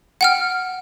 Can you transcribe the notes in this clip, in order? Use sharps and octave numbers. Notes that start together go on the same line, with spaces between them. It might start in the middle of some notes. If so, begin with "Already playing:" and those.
F#5 G5 F6